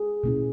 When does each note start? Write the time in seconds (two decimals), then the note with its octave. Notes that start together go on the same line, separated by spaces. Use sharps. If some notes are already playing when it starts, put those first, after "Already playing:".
Already playing: G#4
0.24 B2 A#3 C#4 E4